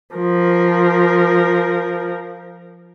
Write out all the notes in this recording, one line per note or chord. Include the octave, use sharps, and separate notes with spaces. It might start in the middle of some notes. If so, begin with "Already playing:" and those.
F3 A#4